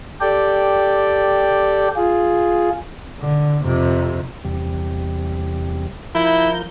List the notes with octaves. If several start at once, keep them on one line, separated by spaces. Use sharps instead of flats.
G4 A4 D5 G5
F4 G#4
D3
F2 C3
E2 C3 G3
F3 E4 A#4 G6